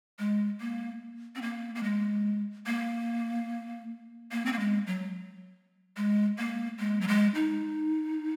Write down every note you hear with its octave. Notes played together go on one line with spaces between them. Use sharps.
G#3
A#3
C4
A#3
A#3
G#3
A#3
A#3
C4
A#3
G#3
F#3
G#3
A#3
G#3
F#3
G#3
D#4